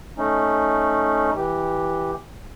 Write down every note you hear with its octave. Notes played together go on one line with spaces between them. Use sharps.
A3 C#4 D#4
E3 G4